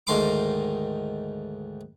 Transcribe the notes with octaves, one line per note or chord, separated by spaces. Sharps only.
D2 G#2 D#3 C6 D6